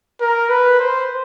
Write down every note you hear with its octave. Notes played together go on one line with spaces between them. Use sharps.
A#4
B4
C5